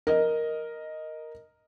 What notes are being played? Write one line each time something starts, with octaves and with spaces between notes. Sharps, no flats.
A#4 D#5